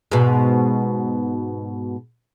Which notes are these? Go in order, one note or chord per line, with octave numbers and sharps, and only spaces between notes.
G#2 B2